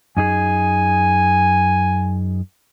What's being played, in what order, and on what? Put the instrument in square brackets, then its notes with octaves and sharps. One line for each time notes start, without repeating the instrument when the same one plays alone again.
[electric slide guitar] F#2 D#4 G#4 [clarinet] G#5